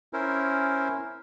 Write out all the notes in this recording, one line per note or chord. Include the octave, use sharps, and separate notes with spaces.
C#4 E4 A#4 C5